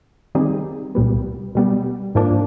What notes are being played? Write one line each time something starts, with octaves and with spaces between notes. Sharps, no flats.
D#3 G3 C4 D#4 G#4
C2 A#2 G3 B3
B2 G3 B3
G#2 F3 A#3 D4